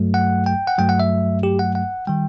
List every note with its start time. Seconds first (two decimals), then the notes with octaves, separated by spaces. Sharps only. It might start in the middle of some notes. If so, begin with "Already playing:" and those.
Already playing: G2 F#3 A3
0.14 F#5
0.46 G5
0.67 F#5
0.78 G2 F#3 A3 G5
0.89 F#5
1.00 E5
1.43 G4
1.59 F#5
1.75 F#5
2.07 D#3 G3 G5